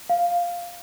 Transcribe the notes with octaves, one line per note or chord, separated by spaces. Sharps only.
F5